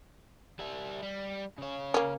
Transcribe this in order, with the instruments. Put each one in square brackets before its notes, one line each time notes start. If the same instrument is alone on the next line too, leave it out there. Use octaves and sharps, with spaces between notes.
[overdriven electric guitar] G3 E5
G3
C#3 C#5
[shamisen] A#3 C#4